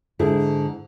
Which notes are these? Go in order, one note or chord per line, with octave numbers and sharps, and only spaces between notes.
G#2 D3 E4 G#4